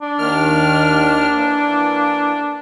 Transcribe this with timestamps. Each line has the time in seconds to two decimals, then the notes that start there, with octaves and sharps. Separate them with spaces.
0.02 D4
0.19 D#2 D#3 F6
1.36 E3 A#3